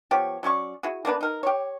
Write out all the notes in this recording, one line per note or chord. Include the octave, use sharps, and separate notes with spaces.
F3 B3 G4 C#5
F#3 C#4 D5 C#6
E4 F#4 G#4
A#3 B3 D4 B4
D#4 A#4
G4 C#5